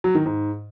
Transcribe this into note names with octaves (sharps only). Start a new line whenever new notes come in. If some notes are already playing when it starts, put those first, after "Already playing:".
F#3
D#3
G#2